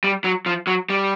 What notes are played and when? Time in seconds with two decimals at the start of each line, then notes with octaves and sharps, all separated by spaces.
0.04 G3
0.24 F#3
0.46 F3
0.67 F#3
0.90 G3